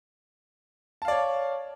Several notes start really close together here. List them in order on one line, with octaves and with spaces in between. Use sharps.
A5 F5 D5 C#5